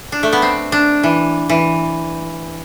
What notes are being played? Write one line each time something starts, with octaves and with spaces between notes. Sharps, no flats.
D4
A3
B3
C4
D4
E3
E3